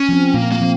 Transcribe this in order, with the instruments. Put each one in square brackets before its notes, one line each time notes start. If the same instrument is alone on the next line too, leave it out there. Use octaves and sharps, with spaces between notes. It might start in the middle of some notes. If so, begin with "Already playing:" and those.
Already playing: [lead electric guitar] C#4
[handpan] F3 C4
[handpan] A#2 [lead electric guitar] A#3
[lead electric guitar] A#3
[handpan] F3 C4